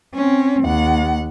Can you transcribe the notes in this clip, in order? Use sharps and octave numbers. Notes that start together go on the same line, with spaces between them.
C4 C#4
D#2 F#5